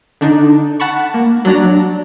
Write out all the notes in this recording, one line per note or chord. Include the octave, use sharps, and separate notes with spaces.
D3 D4 D#4
F#5 A5 B5 C#6
A#3
F#3 D4 A#5